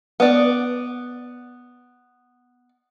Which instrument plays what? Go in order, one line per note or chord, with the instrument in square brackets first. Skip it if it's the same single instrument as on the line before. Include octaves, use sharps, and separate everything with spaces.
[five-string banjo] B3 D5